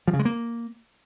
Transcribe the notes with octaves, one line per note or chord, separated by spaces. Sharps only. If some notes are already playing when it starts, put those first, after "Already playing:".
F3
C#3
G#3
A#3